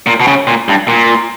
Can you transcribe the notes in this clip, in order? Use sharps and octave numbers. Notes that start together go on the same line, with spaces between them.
A#2
B2
C#3
A#2
G2
A#2